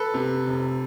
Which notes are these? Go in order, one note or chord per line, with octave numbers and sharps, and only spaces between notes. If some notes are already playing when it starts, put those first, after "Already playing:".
Already playing: A4 B4
C3
F1